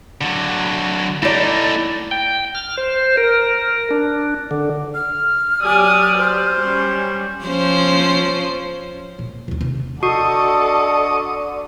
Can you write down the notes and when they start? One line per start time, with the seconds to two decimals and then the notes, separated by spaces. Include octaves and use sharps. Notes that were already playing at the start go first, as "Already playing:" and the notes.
0.21 D3 F#3
1.22 A3 D#4 E4 D5
2.11 G5
2.55 F6
2.77 C5
3.17 A#4
3.90 D4
4.51 D3
4.94 F6
5.61 F#3 G4 D5 G#5 D#6
6.17 C5
6.60 G3 C#4
7.45 F3 C#4 C5
9.19 A#2
9.48 D#1 D#2
9.61 C3 D#3
10.03 D3 F#4 A4 D#5 C#6 D#6